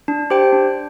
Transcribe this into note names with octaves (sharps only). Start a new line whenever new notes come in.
D4
G4 C5 G5
D4